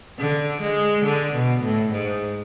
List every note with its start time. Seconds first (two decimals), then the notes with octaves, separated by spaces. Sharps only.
0.18 D3
0.61 G#3
1.05 D3
1.34 B2
1.63 A2
1.92 G#2